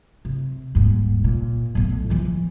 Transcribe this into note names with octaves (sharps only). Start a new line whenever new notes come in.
C3
D#1 G#2
A#2
B1 A2
E3 F3